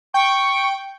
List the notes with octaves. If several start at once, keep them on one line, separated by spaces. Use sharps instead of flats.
G5 C#6